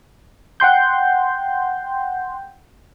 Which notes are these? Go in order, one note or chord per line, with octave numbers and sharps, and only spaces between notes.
F#5 G5 C6 G6